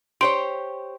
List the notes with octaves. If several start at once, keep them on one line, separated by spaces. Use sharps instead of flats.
G4 C5 C#5 C6 D7